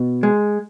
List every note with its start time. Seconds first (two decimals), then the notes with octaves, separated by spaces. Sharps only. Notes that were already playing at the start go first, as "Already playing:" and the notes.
Already playing: B2
0.23 G#3